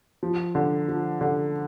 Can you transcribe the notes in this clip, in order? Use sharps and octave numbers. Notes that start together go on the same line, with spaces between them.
F3
D3
F3
D3